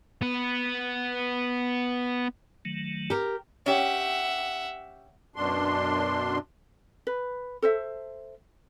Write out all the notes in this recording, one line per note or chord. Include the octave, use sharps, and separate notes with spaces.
B3 B4
D#3 F#3 A3
G4 A#4
C#4 G4 E5 F#5
F#2 B2 D4 C6
B4
A4 C5 E5